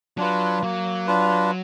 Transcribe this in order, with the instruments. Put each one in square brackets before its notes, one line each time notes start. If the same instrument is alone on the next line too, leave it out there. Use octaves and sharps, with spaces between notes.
[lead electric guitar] F#3 [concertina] D4 F4 B4
[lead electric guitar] F#3 [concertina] A#3
[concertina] D4 F4 B4